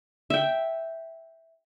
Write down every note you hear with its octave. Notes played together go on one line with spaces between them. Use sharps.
E5 G5